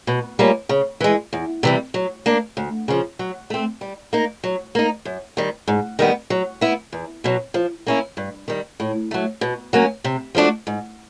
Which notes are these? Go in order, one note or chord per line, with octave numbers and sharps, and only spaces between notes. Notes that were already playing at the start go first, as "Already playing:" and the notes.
B2
G3 A#3 C#4 F4
C#3
E3 G#3
E2
C3 E3 G3
F#3
A#3 D4
D2
C#3 F3
F#3
A3 C4
G3
A#3 D#4
F#3
A#3 D#4
F#2
D#3 G3
G#2
D#3 G3 B3
F#3
B3 E4
E2
B2 F#3
F3
A#3 C#4 E4
G2
D#3 G3
A2
F#3 A3
B2
F#3 A#3 C#4
C3
F3 A3 D4 F#4
G#2